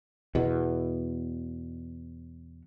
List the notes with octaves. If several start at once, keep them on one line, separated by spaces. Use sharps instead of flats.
E2 B2